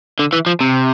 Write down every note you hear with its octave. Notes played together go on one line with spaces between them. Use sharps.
D3
E3
F3
C3